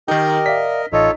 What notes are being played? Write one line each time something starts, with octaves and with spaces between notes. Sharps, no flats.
D#3 D#4 G4 A#4 D#5
D5 E5 F5 B6
A1 D#4 F4 A4 C#5 D#5